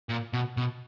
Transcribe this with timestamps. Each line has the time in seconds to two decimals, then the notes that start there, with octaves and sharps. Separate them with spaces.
0.09 A#2
0.33 B2
0.57 B2